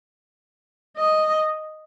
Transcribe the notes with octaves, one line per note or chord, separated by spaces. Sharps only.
D#5